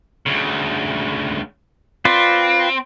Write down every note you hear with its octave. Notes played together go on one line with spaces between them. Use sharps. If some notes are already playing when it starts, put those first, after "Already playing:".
D2 C#3
C4 F4 B4 D5